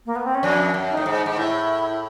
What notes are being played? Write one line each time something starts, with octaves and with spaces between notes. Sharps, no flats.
A#3
B3
C4
C#4
F2 D4
F#2
D#4
A2
G#2
G#2
A2 E4